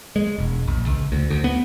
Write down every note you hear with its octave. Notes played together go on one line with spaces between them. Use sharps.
G#3
E1
A#1
C#2
D2
D2
B3